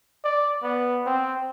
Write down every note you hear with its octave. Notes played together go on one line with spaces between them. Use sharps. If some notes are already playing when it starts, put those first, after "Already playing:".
D5
B3
C4